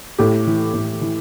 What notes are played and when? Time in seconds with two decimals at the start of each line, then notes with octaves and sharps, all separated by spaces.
0.19 A2 G4
0.47 E3
0.74 A2
1.01 E3